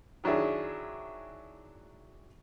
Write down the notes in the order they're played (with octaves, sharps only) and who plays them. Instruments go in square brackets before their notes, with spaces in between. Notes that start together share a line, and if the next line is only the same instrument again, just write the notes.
[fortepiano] D#3 F#3 D4 E4 G#4